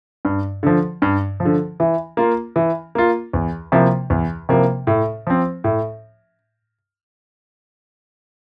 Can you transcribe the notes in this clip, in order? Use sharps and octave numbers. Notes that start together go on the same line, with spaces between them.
G2
D3 F3
G2
F3
D3
E3
A#3 F4
E3
A#3 F4
E2
C3 F3 A#3 E4
E2
C3 F3 A#3 E4
A2
F3 C4
A2